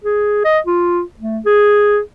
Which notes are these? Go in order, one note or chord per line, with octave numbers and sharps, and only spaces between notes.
G#4
D#5
F4
A3
G#4